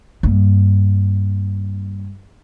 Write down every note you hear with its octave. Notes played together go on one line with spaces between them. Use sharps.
G2 A#3